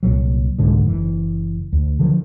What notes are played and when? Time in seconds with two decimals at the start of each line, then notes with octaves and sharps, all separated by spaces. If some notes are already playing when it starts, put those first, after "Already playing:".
0.03 C2 A#2 F#3
0.58 C2 G#2 D3 G#3
0.85 F#1 E3
1.73 D2
1.99 D3 D#3 F3 F#3